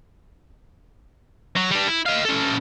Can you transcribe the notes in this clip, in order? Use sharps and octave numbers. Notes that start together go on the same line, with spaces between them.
F#3
G3 D4
E4
D#5 F5
C#4 A4